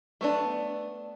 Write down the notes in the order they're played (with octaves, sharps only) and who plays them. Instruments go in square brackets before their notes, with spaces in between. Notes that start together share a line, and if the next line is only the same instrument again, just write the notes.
[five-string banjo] A3 B3 D4